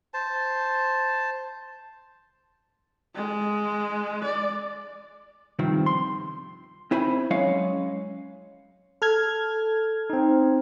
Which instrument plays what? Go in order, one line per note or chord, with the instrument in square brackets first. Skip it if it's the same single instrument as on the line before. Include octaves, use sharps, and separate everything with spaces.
[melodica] C5 A5
[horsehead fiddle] G#3
D5
[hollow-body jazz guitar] G2 C3 D#3 F3 C4
C6
C4 E4 C5 G#5 B5
F#3 G#3 C#4 C#5 D#5 F5
[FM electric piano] A4 F6 G#6
[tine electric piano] C4 D#4